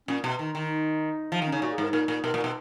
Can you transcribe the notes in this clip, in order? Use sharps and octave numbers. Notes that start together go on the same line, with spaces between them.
A#2 C#4
B2
D#3
D#3
F3 D#4
D#3
C#4
C#3
A#2 F#4
G#4
G#2 A#4
A#2 A#4
A#2 A#4
B2 A#4
A#2
B2